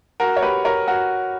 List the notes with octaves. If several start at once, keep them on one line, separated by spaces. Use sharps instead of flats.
F#4 A#4
C#5
G4 B4
A#4 C#5
F#4 A#4